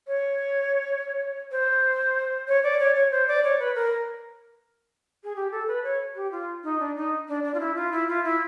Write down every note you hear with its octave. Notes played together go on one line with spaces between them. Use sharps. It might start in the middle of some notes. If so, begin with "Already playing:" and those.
C#5
C5
C#5
D5
C#5
C#5
C5
D5
C#5
B4
A#4
G#4
G4
A4
B4
C#5
G4
F4
D#4
D4
D#4
D4
D4
F4
E4
F4
E4
F4
E4